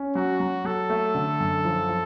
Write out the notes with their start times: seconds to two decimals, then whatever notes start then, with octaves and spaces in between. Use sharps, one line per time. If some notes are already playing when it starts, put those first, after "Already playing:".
Already playing: C#4
0.15 F#3 F#4
0.40 F#3
0.65 F#3 A4
0.90 A3
1.15 D3
1.40 F#2
1.65 F3
1.89 F3